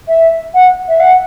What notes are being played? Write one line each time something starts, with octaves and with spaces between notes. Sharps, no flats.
E5
F#5
E5
F#5